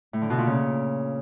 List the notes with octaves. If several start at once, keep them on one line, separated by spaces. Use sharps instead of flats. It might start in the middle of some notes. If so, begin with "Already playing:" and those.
A2
D3
B2
A#2
C#3